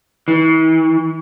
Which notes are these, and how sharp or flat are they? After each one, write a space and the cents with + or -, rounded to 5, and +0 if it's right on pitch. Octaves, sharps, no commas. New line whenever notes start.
E3 -40